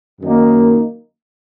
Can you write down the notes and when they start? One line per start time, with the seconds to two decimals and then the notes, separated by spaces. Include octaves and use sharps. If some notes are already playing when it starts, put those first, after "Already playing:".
0.21 F#2 D#3 A#3 D#4